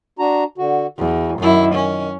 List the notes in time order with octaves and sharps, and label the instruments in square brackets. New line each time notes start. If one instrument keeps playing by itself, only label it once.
[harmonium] D4 F#4 A#5
D3 F#4
[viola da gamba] E2 [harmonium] F#4
[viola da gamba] F#2 E4 [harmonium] D#3
[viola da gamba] C#4